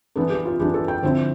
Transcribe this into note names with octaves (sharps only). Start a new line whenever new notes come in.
E3 B3 D4 A4
G4
F4
E3 B3 D4 G4
A4
G5
D3 F3 C4 E4 C5